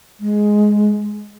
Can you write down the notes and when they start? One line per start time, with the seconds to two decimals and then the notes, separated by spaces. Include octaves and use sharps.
0.20 G#3